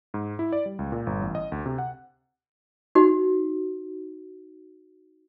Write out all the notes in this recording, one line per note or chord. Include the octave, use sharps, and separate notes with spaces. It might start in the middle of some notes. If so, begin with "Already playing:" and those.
G#2
E4
D5
G3
C#2
A#2
G1
A1
D#5
D2
C3
F#5
D#4 F#4